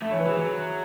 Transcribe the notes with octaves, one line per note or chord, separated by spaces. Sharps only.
A3 E5
C#5
E3
B4
E3 G#4
F#3